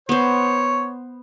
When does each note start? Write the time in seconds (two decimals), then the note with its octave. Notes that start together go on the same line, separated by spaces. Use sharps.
0.09 B3 C5 C#5